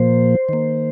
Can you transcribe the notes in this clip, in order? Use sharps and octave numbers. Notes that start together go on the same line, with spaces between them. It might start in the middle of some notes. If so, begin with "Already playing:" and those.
Already playing: A#2 F3 A#3 C5
D#3 A#3